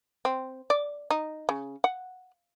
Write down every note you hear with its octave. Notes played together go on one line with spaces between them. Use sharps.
C4
D5
D#4
C#3
F#5